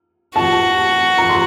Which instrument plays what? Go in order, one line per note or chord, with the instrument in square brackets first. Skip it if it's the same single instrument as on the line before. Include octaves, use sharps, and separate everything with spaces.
[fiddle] F#4 [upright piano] A5
[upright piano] A#5
C6